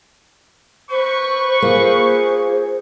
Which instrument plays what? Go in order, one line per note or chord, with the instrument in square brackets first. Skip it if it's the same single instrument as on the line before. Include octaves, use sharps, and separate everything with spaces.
[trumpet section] B4 C#6 [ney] C5
[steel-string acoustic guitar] A#3 F4 [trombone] G#4